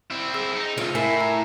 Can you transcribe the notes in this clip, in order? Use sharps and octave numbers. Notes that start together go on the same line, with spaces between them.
C4 E4
G#4 E6 A#6
D#4
C2 A3 F4
A2 E4 A#4 G#5
A#5